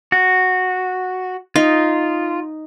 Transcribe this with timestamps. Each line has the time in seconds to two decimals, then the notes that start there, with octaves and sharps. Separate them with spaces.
0.12 F#4
1.56 D#4 F4